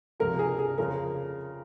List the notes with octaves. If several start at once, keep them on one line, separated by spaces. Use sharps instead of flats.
C#2 C3 F3 A#4
G#4
G#4
F2 C#3 F3 A#4